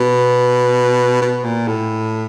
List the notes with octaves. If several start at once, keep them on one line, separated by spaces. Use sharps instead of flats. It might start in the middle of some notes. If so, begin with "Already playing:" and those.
Already playing: B2
B2
A#2
A2